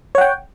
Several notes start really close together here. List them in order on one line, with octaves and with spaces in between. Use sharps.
C#5 F#5 G5